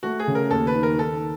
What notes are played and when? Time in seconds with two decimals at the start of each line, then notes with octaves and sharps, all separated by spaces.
0.03 A3 F#4
0.20 G#4
0.27 C#3
0.35 A#4
0.51 D#2 A4
0.67 B4
0.74 D#3
0.83 A#4
0.99 D#3 A4